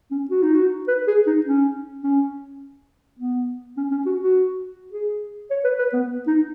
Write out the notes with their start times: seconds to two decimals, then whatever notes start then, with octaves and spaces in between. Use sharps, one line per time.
0.11 C#4
0.30 F#4
0.42 D#4
0.54 F#4
0.88 B4
1.07 G#4
1.27 D#4
1.46 C#4
2.03 C#4
3.19 B3
3.77 C#4
3.91 C#4
4.06 F#4
4.20 F#4
4.92 G#4
5.50 C#5
5.64 B4
5.79 B4
5.93 B3
6.27 D#4